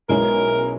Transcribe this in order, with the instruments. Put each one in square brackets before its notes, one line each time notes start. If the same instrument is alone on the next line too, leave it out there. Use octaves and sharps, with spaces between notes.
[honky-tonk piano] B1 B2 G#3 C#4 E4 [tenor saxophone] A#4